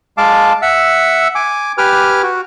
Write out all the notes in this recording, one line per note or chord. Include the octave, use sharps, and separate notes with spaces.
G#3 F5 A5 D6
E5 F#5 E6
G#5 D6
G4 B4 G#5 D6 F6
F#4